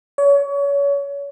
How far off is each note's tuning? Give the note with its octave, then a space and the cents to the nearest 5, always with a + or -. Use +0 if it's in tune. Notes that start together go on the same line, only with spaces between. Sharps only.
C#5 +30